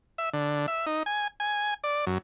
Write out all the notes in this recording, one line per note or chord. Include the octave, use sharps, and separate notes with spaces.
E5
D3
E5
D#4
G#5
G#5
D5
F#2